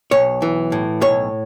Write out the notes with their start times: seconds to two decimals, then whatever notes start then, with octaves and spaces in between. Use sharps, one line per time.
0.11 B1 C#5
0.42 E3
0.72 A2
1.02 B1 C#5